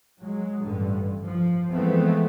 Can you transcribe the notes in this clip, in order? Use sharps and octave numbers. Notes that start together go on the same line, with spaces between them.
F#3 G#3
A1 G2 D3
F3
E3 F3 G#3 A3 B3 C4